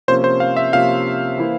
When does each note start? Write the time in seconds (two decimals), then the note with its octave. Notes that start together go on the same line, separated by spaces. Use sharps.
0.08 C3 F3 A#3 C#4 C5
0.24 C5
0.40 F5
0.56 E5
0.73 C3 F3 A#3 C#4 F5
1.38 E3 A#3 E4